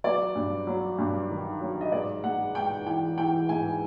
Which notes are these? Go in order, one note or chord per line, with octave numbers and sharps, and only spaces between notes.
F#3 D5
G2
F#3
G2
D#3
F#3
D#5
G#2 D5
G#3 F#5
G#2 G5
E3 G5
E3 G5
G#2 G#5